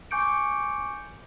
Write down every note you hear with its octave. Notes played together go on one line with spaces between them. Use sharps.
G#5 C#6 D6 G6 C#7 D7